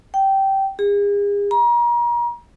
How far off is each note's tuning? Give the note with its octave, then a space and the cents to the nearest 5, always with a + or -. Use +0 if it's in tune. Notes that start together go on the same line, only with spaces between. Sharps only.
G5 -15
G#4 -40
A#5 +35